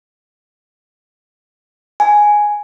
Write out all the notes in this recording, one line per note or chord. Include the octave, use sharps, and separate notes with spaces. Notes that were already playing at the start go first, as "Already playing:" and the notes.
G#5